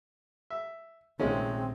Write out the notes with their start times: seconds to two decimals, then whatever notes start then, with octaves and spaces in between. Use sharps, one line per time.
0.50 E5
1.20 A#1 C3 D#3 G#3 A3 C4 C#4 F4